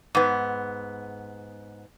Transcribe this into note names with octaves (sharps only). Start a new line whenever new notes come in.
G#2 B3